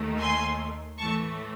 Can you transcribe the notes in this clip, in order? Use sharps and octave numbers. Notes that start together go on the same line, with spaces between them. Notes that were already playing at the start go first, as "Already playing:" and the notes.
Already playing: D#2 D#3 A3
G#5 C6
A2 E3 A3 A5 C#6